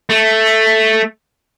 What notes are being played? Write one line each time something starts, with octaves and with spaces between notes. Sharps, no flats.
A3